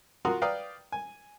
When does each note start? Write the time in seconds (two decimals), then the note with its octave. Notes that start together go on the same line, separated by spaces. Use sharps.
0.25 F4 F#4 A#4 F#5 C6 D#6
0.42 B4 D5 F5 G5 A#5 D#6
0.92 G#5